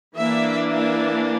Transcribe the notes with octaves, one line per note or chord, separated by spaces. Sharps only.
E3 A#3 D4 E5
E5